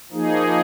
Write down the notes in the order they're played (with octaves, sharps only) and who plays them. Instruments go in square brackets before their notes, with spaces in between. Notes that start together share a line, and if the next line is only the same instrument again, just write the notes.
[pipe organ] F3 A#3 D#4 G#4